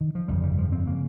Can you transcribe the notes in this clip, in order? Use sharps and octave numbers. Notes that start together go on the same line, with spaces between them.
D#3
F3
G1 F2 C#3 G3
G3
F3
C4
C#3 A#3